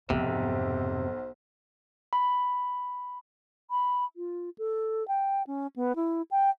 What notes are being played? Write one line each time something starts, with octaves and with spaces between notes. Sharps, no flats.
B1 F2 G#2 C3 C5
B5
B5
F4
A4
G5
C#4
B3
E4
G5